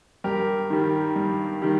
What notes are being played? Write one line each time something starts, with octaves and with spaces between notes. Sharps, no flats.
G2 G4 A#4
D#3 G3
G2
D#3 G3